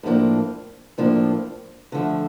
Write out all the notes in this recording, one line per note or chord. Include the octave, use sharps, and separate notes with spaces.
A2 F3 A#3 D4
A2 F3 A#3 D4
D3 F3 A3